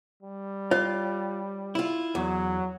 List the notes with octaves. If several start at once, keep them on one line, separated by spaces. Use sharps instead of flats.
G3
F4 C#5
E4 F4
E2 F#3